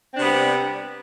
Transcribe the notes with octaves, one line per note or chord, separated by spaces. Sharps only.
C3 G3 B3 C4 D4